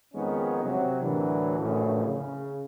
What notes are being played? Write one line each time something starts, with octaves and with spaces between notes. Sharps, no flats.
F2 D#3 G#3 B3 C#4 D#4
C3 F#3
D2 A2 E3 F#3 D4 A#4
A#1 F#2 A2 C#3 E3 A3
C#3